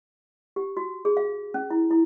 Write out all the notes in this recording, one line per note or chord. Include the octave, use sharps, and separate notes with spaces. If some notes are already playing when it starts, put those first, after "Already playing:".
G4
F#4
G#4
F5
C#4
E4
E4